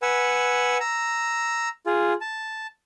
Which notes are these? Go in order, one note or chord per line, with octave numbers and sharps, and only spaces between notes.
B4 F#5 G#5 E6
A#5 E6
F4 G#4
A5